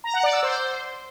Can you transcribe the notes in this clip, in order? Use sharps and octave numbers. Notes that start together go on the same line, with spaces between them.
A#5
F#5
D5
E6
C5